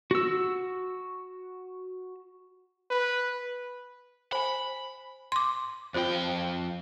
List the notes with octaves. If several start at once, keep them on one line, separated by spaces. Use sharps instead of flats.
F#4 E6
B4
C5 G#5 B5
C6 D6
F2 F4 C5 G5